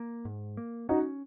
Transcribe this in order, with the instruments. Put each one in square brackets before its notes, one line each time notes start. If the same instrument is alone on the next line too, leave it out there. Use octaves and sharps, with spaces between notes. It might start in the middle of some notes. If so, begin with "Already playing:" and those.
Already playing: [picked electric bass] A#3
G#2
A#3
[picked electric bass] C#4 [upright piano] D#4 F#4